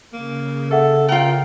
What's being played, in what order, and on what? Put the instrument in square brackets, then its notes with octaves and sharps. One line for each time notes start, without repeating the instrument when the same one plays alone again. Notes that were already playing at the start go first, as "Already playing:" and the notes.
[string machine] C#3 [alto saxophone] A#3
[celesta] G#4 E5 F#5 [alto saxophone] A4
[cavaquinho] F4 A#4 [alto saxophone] G5